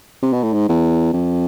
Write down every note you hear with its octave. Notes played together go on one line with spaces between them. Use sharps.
C3
B2
A2
G#2
E2
F2